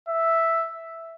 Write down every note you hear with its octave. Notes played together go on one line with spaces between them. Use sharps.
E5